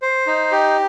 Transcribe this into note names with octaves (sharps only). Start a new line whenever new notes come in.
C5
D#4
G4